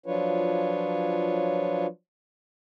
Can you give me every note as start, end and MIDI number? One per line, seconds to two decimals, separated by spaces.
0.06 1.86 53
0.06 1.86 54
0.06 1.86 62
0.06 1.86 65
0.06 1.86 71
0.06 1.86 73